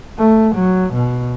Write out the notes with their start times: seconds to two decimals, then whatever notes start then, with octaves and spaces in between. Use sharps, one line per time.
0.18 A3
0.56 F#3
0.94 B2